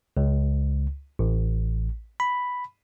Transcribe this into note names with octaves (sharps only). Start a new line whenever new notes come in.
C#2
A1
B5